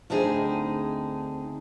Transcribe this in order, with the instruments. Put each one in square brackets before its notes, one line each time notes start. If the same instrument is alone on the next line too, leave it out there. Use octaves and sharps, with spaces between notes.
[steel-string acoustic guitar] D2 D3 C4 D#4 G#4